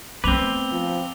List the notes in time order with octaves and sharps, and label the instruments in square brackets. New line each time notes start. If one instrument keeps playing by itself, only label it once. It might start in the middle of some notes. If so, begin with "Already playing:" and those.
[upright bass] A3 B3 [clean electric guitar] C4 B4 [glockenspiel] D6 F7 G7
[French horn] F3